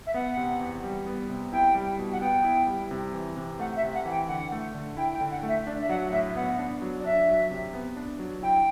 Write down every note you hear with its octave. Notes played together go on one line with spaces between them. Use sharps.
E5
B3 F#5
C3
E2
G3
B3
C3
E4 G5
G3
B2
F#5
B3 G5
E4
G3
C3
E3
C3
A3 F#5
E5
C3
F#5
E3
G5
D3 F#5
A3
D3
E4 G5
G5
D3
F#5
A3
E5
D4 D5
E5
F#3 F#5
A2 E5
B3 F#5
D4
F#3
D5
D4 E5
F#3
C3
B3
D4
F#3
E4 G5